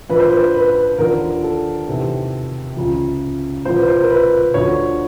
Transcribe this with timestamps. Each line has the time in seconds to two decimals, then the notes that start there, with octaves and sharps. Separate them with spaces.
0.10 F2 D3 F3 B4
0.20 C5
0.30 B4
0.55 B4
0.99 D#2 D3 F3 A#4
1.44 A4
1.87 E2 C3 D#3
2.76 C#2 C#3 F3
3.65 C2 A#2 F3 C5
3.77 B4
3.88 C5
4.01 A#4
4.10 B4
4.54 D2 D3 F3 C#5